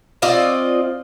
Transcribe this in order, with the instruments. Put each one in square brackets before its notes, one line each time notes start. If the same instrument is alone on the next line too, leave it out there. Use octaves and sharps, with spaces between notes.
[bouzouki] C4 F4 D5 D#5